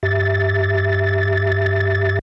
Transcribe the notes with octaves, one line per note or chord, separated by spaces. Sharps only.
G2 G4 E5 A6